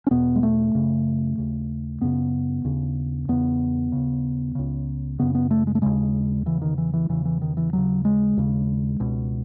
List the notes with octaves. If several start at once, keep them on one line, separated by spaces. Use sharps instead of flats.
C#4
E2 B2 B3
G#3
A3
F#2 C#3
D#2 C#3
F#2 C#3 B3
D#2 C#3
E2 C#3 B3
D#2 C#3
C#2 C#3
F#2 C#3 B3
B3
A3
G#3
A3
D#2 C#3 G#3
E2 C#3 E3
D#3
E3
E3
E2 C#3 E3
E3
D#3
E3
D#2 C#3 F#3
G#3
D#2 C#3
C#2 B2